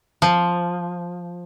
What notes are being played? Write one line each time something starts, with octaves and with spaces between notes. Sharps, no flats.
F3